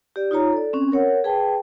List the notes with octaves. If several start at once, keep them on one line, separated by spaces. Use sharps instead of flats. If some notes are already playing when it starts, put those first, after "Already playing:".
G4 D5
D#4 F4 C#5 A#5
A4 D5
C4 C#4
A#4 C#5 F#5
G#4 B4 G5 A5